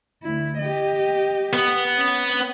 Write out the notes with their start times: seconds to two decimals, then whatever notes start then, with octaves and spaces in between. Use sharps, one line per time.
0.23 D2 E4
0.59 G4 D#5
1.53 B3
1.96 C#4